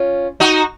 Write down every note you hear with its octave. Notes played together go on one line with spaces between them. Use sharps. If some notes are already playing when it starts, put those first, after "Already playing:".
Already playing: C#4 F4
D#4 F#4